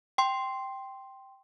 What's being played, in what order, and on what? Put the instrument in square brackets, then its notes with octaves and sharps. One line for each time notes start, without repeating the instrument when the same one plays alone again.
[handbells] G5 C6